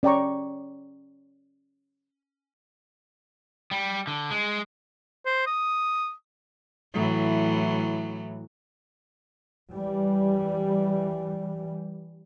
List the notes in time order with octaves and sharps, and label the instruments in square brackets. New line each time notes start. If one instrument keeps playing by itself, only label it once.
[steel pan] C#4 D5 G5 A#5 C#6
[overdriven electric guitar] G3
D3
G#3
[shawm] C5
D#6
[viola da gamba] A2 E3 F#3
[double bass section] E3 G3